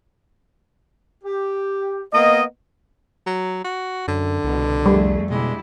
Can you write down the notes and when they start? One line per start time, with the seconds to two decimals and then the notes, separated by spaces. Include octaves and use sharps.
1.24 G4
2.13 A#3 B3 D#5
3.27 F#3
3.65 F#4
4.08 F#2 D3
4.44 C2 B2
4.86 F2 G3 A3 G#4
5.31 B2 D3 G#3 E4 G4